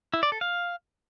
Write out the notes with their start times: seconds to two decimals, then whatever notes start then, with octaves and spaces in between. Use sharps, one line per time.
0.14 E4
0.23 D5
0.32 A4
0.41 F5